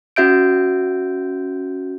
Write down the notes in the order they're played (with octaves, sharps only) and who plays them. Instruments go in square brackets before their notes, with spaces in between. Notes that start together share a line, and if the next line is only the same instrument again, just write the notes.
[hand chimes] C#4 F#4 E5 G6 D7